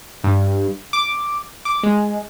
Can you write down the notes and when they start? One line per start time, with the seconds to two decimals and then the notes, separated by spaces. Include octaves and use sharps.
0.24 G2
0.93 D6
1.65 D6
1.83 G#3